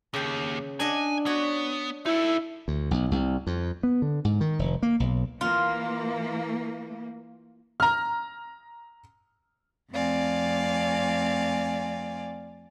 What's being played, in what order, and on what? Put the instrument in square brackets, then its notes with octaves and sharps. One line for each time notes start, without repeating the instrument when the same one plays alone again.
[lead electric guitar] D#2 [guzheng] C#3 G5
[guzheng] D4 D#5 F#5 [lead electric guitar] G#5
[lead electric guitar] B3 [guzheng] F#4 C#5
[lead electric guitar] D#4 A4 [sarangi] E4
[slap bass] D2
B1
C2
F2
B3
D3
G#2
D#3
F1
A#3
B1
[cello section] E3 A#3 [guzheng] F4
[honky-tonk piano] A#5 F6
[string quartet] F2 A3 C4 D5 F5 G#5